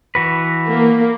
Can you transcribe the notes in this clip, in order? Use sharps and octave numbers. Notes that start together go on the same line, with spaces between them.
E3 F#4 B4
A#3